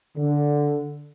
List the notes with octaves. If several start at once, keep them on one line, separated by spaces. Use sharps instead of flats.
D3